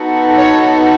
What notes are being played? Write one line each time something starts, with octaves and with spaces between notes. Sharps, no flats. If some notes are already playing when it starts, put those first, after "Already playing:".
Already playing: B3 D#4 F#4 A4
C#5